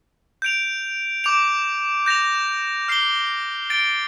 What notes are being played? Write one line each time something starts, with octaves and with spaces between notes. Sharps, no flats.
G6 D7 F7
D6 G6 D7 F7
G6 A#6 F7
F6 C7 G7
A6 D7 G7